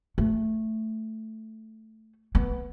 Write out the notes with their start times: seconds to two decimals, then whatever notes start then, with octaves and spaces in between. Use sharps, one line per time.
0.18 A3
2.35 B3